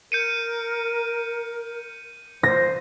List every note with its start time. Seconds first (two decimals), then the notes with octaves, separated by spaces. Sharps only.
0.12 A#4 G6 C#7 D#7
2.43 C5 A#6